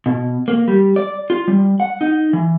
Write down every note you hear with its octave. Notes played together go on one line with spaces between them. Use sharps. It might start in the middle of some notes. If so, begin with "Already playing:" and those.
B2
A#3
G3
D5
F4
G3
F#5
D#4
E3